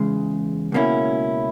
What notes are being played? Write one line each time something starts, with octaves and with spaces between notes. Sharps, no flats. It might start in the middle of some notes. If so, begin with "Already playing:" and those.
Already playing: E2 C#3 G#3
C#2 B2 A#3 C#4 E4